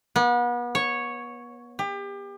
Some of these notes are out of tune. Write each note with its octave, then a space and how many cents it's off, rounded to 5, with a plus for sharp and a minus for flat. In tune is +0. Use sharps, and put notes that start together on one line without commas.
B3 -35
C#5 -5
G4 +30